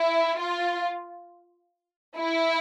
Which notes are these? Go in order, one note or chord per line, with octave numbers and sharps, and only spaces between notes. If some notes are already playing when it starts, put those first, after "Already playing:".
Already playing: E4
F4
E4